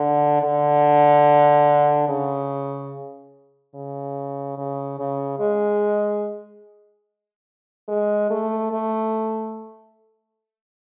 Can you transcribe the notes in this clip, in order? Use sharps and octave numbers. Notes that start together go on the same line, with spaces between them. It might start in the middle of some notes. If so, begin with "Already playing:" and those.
Already playing: D3
D3
C#3
C#3
C#3
C#3
G#3
G#3
A3
A3